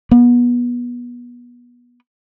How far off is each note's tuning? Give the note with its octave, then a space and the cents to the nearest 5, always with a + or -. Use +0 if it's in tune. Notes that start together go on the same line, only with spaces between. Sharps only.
B3 -25